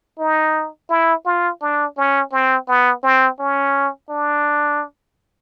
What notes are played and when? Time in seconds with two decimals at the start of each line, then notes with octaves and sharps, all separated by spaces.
0.19 D#4
0.90 E4
1.26 F4
1.62 D4
1.97 C#4
2.32 C4
2.68 B3
3.03 C4
3.40 C#4
4.10 D4